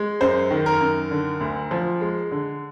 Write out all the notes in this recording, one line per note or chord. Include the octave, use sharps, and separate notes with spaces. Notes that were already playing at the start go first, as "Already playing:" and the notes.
Already playing: G#3
F#2 C5
D#3
A#4
F#2
D3
D2
F3
G#3
D3